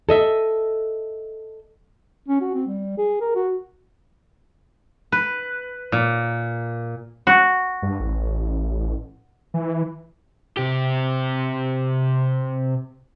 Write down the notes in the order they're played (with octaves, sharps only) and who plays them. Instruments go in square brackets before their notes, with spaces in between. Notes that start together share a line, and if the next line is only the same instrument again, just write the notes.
[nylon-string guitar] A4 D#5 E5
[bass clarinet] C#4
F#4
C4
G3
G#4
A#4
F#4
[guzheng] B4
A#2
[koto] F#4
[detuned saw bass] G2
A1
E3
[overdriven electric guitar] C3 G4